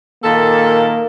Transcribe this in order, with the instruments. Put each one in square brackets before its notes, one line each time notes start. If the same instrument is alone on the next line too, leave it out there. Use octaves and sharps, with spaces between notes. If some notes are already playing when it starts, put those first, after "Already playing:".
[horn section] A#2 D#3 A4 [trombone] A#3